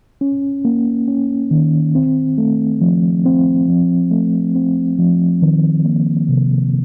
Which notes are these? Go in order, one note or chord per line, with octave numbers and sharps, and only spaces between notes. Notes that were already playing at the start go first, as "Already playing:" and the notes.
C#4
A#3
C#4
D#3
C4
A3
F3
C4
F3
A3
C4
F3
D#3
A#3
C3